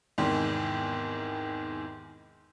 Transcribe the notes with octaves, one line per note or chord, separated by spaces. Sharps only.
E2 G#2 C3 D#3